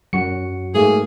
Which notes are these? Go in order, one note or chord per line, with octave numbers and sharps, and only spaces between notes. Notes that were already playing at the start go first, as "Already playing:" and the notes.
F#2 F#3 F#4 C#7
G#2 A3 A#3 G#4